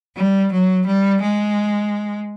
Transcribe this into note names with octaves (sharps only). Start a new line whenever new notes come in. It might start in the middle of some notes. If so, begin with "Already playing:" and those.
G3
F#3
G3
G#3